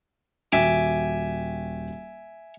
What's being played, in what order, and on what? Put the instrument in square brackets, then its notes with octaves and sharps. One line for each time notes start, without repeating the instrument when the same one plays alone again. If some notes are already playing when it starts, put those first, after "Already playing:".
[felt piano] D#1 F#4 G5 [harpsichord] E5 G#5 D6